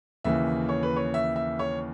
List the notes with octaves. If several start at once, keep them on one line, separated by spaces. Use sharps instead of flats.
D#2 C#3 E3 E5
C#5
B4
C#5
E5
E5
C#5